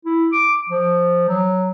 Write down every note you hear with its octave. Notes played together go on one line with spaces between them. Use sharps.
E4
D6
F3
F#3